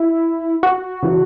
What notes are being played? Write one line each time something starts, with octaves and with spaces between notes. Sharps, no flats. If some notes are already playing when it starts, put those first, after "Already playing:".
Already playing: E4
F#4
C#3 E3